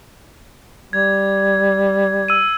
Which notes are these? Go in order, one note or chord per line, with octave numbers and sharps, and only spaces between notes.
G3 G#6
E6 D#7